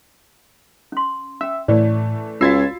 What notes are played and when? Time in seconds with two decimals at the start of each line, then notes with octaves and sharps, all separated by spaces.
0.92 C#4 C6
1.41 C#4 E5 G5
1.68 A2 E3 A3 D5
2.41 C#2 F4 F#4 F5 E6 G#6 A6 C7